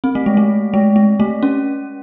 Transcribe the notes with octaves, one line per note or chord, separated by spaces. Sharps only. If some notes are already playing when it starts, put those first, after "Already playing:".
C4
A3
G#3
A3
G#3
G#3
A3
C#4